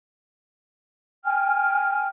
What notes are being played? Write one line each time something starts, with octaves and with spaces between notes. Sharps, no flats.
G5 G#5 F6